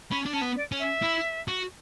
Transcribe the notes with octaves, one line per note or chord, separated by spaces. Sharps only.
C#4 B5
D4
C#4 A5
B3
D5
C#4
E5
E4
F#4